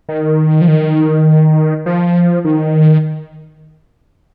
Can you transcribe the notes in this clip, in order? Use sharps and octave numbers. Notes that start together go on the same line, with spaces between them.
D#3
F3
D#3
F3
D#3